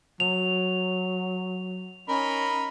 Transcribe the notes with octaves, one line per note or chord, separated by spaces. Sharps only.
F#3 F7
C#4 D#4 A#4 B5